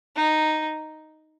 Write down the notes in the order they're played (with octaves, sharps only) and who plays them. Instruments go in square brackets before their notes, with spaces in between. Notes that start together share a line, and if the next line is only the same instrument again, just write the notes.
[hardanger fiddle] D#4